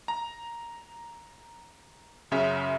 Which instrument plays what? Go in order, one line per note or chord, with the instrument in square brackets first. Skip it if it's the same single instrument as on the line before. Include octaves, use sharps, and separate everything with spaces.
[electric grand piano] A#5
F#2 C#3 C#4 E5